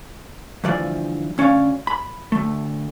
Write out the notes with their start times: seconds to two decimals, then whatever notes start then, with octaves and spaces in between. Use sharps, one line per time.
0.64 D2 G2 E3 F3 D5
1.38 D2 C#4 C#5 D5 F5
1.87 B5
2.32 D2 A3